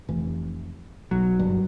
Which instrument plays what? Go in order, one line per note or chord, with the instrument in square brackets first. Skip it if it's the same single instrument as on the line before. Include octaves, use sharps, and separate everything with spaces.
[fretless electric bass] F1 E3
[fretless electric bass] B1 [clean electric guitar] F#3
[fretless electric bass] F#1 G2